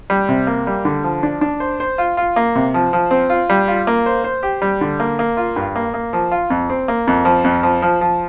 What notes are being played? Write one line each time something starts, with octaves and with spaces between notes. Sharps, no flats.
G3
C3
A#3
G3
D3
F3
D4
D4
C5
C5
F4
F4
A#3
C3
F3
F3
C4
F4
G3
F4
A#3
C5
C5
G4
G3
D3
A#3
A#3
F4
G2
A#3
A#3
F3
F4
F2
C4
A#3
F2
F3
F2
F3
F3
F3